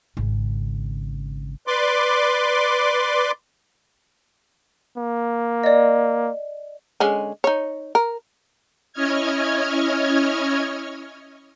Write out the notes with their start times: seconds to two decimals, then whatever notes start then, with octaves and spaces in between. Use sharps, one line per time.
0.17 G#1 C#3
1.67 B4 D5 C6 D6
4.98 A#3
5.64 D5 D#5
7.00 D3 G#3 C#4
7.44 D#4 C#5
7.95 A#4
8.93 C#4 E4 C#5 D#5 F6 G#6